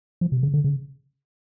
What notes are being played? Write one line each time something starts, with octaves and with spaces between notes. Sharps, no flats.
F3
C3
C#3
D3
C#3